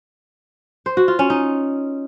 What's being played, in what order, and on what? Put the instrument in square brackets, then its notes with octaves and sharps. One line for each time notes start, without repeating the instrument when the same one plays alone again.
[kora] C5
F#4
F4
C#4
D#4